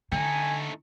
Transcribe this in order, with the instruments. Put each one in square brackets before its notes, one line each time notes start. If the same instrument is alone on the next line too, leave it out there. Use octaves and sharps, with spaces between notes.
[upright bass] D3 [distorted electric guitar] A3 D#4 [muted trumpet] G#5